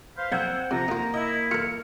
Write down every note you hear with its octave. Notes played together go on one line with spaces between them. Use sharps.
B4 C5 F5
A#1 C4 F#5 E6 G6 G#6
C3 F3 A#5
A#3 D#4 F4
E4 D#5
F4 A#4 F6 C#7